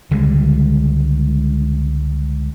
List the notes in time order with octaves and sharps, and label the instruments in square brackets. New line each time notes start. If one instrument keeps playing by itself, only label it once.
[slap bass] C#2 D3 G3 G#3